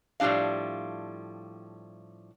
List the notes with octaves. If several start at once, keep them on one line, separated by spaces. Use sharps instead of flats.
A2 F3 G3 D4 F5